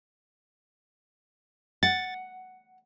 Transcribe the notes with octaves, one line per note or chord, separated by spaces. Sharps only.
F#5 A6